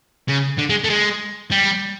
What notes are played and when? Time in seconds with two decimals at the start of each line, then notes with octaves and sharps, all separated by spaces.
0.28 C#3
0.58 D3
0.69 G#3
0.84 A3
0.90 G#3
1.51 G3